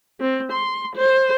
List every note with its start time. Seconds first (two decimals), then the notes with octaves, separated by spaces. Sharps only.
0.20 C4
0.53 C6
0.96 C5